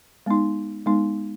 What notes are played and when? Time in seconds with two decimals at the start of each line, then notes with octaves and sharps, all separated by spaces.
0.26 G#3 B3 D#4
0.86 G#3 B3 D#4